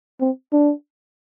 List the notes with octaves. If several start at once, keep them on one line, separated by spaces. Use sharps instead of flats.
C4
D4